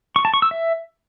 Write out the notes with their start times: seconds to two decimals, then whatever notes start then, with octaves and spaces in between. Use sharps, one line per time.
0.16 C#6
0.25 A5
0.34 C#6
0.42 E6
0.51 E5